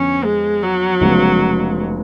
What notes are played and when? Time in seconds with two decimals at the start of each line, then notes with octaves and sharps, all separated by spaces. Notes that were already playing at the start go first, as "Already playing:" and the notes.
Already playing: F2 D3 F3 B3 C#4
0.24 G#3
0.63 F#3
1.00 F1 F2 C#3 G#3 B3